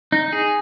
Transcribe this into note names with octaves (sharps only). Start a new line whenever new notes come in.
D#4
G#4